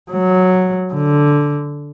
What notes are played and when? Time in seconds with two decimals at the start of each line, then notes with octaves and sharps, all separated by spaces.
0.11 F#3
0.93 D3